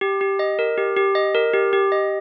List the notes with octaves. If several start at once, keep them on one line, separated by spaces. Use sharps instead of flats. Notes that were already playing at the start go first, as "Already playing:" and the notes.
G4
G4
D#5
A#4
G4
G4
D#5
A#4
G4
G4
D#5